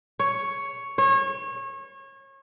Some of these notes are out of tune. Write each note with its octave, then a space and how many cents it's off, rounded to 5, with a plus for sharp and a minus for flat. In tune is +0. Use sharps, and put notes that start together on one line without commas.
C#5 +5
C#5 -30